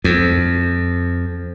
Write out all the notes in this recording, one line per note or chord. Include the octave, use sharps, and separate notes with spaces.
F2